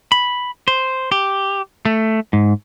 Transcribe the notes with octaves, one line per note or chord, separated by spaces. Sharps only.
B5
C5
G4
A3
G#2